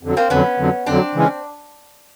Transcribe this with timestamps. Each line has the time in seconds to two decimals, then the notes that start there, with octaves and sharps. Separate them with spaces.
0.03 F2 D3 F#3
0.17 A#3 C4
0.30 F2 D3 F#3 B3 C#4
0.59 F2 D3 F#3
0.86 F2 D3 F#3 C4 D4
1.15 C#3 E3 G#3 C#4